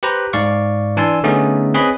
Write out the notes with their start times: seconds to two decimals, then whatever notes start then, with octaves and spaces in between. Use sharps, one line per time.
0.03 G4 B4 C5 A#5
0.33 G#2 D5 F5 C#6
0.97 E3 D4 G#5 A5 C6 E6
1.23 D3 A3 B3 C#4 D#4 G#4
1.74 C4 G#4 B4 C#5 D#5 B5